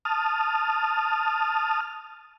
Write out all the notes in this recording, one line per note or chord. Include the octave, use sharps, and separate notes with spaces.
A5 D#6 F6